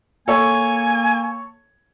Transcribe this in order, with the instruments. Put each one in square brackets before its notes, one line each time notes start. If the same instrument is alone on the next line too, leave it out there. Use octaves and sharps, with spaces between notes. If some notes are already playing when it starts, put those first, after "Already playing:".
[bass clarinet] A#3 [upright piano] A4 C#5 [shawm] G#5